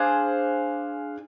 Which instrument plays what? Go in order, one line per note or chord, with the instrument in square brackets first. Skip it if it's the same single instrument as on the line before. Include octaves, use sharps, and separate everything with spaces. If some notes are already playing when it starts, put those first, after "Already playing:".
Already playing: [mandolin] D4 G#4 C5 [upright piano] F5